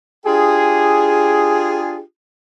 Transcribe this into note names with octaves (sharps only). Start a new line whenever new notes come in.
D4 F4 G4 G#4